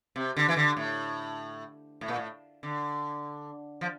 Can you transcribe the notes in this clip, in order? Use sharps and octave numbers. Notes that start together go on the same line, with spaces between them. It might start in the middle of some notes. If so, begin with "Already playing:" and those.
C3
D3
E3
D3
A2
A2
A#2
A2
D3
F3